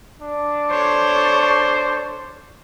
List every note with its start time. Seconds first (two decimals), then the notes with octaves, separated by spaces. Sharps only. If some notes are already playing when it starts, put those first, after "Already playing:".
0.22 D4
0.70 A4 C5 C#5